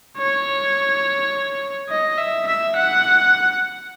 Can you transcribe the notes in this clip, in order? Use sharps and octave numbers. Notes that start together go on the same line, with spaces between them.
C#5
D#5
E5
E5
F#5